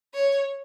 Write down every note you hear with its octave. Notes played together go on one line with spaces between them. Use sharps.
C#5